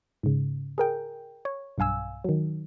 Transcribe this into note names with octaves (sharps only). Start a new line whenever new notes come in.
G#2 C#3
G#4 A#4 G5
C#5
B1 G2 F5 G#5 E6
D#3 F#3